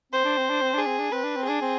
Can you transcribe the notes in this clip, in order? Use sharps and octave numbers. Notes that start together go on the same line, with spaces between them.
C4 C5
D4
C4
D4
C4
D4 G#4
C4
D4
C4 B4
D4
C4
D4 G#4
C4